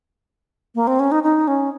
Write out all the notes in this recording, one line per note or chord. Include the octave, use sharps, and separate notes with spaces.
A#3
C4
C#4
D#4
D#4
C#4